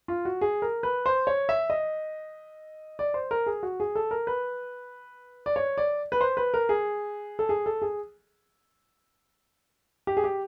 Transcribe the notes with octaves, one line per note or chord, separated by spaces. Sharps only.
F4
F#4
G#4
A#4
B4
C5
C#5
E5
D#5
D5
C5
A#4
G#4
F#4
G#4
A4
A#4
B4
D5
C#5
D5
B4
C5
B4
A#4
G#4
A4
G#4
A4
G#4
G4
G#4
G4